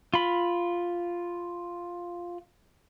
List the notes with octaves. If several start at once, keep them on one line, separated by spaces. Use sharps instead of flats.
F4 B5